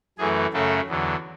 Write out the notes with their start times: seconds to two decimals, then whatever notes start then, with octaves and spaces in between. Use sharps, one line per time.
0.18 F#2 E3 A3 G#4
0.53 F#2 C#3 F#3 A3 A4
0.87 E2 D3 F#3